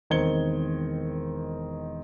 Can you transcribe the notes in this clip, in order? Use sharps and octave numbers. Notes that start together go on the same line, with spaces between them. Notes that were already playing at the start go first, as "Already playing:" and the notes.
E1 D#3 C4 G#6 C#7 G7